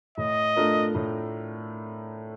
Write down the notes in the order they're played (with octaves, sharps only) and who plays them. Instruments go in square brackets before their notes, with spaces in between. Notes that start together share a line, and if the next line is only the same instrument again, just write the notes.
[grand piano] A2 [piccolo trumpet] D#5
[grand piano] A3 D4 F4 A#4
A2